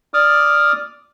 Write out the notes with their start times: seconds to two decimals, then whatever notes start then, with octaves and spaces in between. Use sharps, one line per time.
0.14 D5 D6 D#6 F6